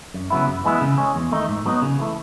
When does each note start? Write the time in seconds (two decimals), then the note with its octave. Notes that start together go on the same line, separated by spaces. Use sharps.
0.14 F#2
0.30 C#3 F#3 B3 E4
0.47 F#2
0.64 E3 G#3 B3 E4
0.81 C#3
0.98 G#3 C#4
1.15 E2
1.31 D#3 A3 D#4
1.49 G#2
1.66 F#3 B3 D#4
1.82 C#3
1.99 E3 A3